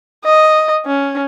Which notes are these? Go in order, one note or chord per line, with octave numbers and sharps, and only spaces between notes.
D#5
C#4